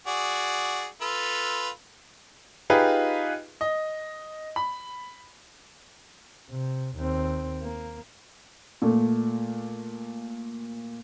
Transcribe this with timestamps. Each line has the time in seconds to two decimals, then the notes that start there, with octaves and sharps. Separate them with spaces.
0.07 F#4 G#4 D5
1.01 F4 A4 B4
2.70 D#4 F4 G4 G#4 B4
3.61 D#5
4.56 B5
6.50 C3
6.97 D#2 C4
7.63 A#3
8.82 A#2 A3